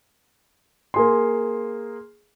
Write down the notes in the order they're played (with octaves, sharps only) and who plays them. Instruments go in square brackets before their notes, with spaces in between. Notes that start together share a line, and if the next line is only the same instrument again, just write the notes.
[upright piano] A#3 G#4 C6